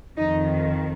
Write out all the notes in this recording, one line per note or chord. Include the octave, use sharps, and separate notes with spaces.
F2 D#3 D#4